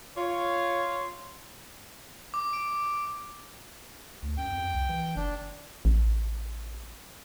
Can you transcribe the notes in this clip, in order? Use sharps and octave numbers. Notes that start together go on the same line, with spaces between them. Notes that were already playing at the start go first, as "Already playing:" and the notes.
F4 C#5
D6
D7
D2
F#2 G5
F2
C2
E3
F#1 D4
A1